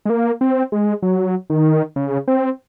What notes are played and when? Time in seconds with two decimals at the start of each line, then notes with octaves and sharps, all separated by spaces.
0.06 G#3
0.10 A#3
0.41 C4
0.72 G#3
1.02 F#3
1.50 D#3
1.96 C#3
2.28 C4